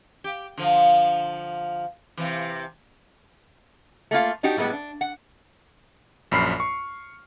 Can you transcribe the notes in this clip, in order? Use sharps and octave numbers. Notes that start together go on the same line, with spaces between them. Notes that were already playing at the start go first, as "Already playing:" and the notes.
G4
D3 F3
C3 E3
A3 A#3 F4 F5
D4 D#4 F#4 G4
A2 G3 G#3 B3
D4
F#5
A#1 F#2 B5 F6 C7
C#6